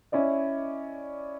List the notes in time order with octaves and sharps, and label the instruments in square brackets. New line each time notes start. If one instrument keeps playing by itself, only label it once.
[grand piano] C#4 E4 D5 D#5